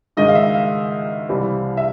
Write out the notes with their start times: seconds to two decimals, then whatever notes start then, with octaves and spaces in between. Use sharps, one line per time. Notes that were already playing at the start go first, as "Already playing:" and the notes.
0.17 G#2 D#3 G#3 D#5
0.28 F5
0.35 E5
0.54 F5
1.29 C2 C3 E3 G3 C4
1.77 E5